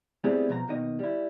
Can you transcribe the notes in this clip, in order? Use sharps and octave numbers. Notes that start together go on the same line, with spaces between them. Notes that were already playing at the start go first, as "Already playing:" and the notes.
G3 A3 B3 C4 E4 G#4
B2 F3 E5 A#5
D#2 B2 D#3 D#5
G3 E4